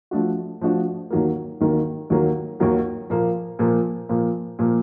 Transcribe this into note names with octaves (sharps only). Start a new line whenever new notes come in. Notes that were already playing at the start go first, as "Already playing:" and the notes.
F3 A3 D4 F#4
F3 A3 D4 F#4
D#2 D#3 F#3 A#3
D#2 D#3 F#3 A#3
D#2 D#3 F#3 A#3
D#2 D#3 F#3 A#3
A#2 F3 A#3
A#2 F3 A#3
A#2 F3 A#3
A#2 F3 A#3